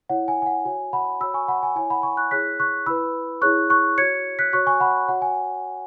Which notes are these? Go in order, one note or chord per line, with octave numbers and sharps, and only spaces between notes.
E4 C#5 F#5
G#5
G#5
F#5
F#4 C#5 G#5
F#5 B5
F#4 C#5 B5 E6
G#5 C#6
F#5 B5
G#5
E4 C#5 G#5
F#5 B5
G#5 C#6
C#6 F#6
E4 G#4 C#5 F#6 B6
C#6 F#6
E4 B4 B5 E6
E4 G#4 C#5 C#6 F#6
C#6 F#6
F#4 C#5 G#6 C#7
F#6 B6
F#4 C#5 C#6 F#6
G#5 C#6
F#5 B5
F#4 C#5 F#5
G#5